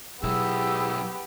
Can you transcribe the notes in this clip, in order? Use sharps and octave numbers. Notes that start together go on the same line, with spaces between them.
B1 B2 F#3 B3 E4 G4 G#4 E6